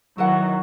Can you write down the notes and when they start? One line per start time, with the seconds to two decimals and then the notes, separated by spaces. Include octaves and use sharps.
0.18 D#3 F#3 E4 B4 F#5